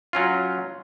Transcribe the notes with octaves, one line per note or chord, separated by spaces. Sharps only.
F#3 C#4 F4